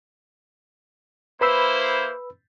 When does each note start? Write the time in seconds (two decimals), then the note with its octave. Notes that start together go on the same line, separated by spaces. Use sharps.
1.41 A#3 E4 B4 C5 B5 E6